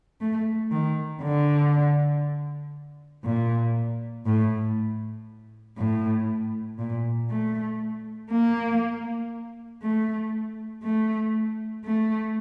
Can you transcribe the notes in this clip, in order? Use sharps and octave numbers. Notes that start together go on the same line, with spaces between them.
A3
D#3
D3
A#2
A2
A2
A#2
A3
A#3
A3
A3
A3